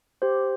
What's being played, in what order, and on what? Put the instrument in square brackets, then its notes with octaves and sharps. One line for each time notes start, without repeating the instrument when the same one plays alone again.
[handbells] G4 C5